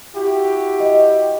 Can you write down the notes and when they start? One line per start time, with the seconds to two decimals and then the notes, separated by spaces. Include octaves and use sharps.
0.14 E4 F#4 G4
0.80 D#5